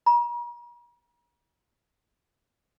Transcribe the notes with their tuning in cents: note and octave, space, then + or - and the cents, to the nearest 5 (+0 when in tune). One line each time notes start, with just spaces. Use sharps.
A#5 +45